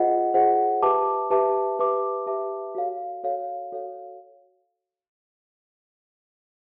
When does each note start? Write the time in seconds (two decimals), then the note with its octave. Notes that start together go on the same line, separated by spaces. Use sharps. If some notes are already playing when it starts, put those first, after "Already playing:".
Already playing: F4 G#4 C5 D#5 F#5
0.34 F4 G#4 C5 D#5 F#5
0.82 G4 B4 E5 A5 D6
1.30 G4 B4 E5 A5 D6
1.79 G4 B4 E5 A5 D6
2.27 G4 B4 E5 A5 D6
2.75 F#4 A4 C#5 F5
3.23 F#4 A4 C#5 F5
3.72 F#4 A4 C#5 F5